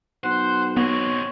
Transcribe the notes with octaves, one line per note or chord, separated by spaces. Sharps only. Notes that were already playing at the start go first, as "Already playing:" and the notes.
B1 C5 F#5
B2 B3 C4 C#5